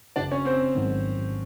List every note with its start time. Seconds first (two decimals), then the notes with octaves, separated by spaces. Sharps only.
0.16 G#1 F#2 C#3 D4 D5
0.31 C#4 C#5
0.45 C4 C5
0.75 A1 G#2 D#3 F#3 B3